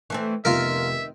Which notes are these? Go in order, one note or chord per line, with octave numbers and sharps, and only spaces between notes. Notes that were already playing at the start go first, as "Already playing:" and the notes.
E3 A3 C4
F1 D#3 B3 F4 A#4 E5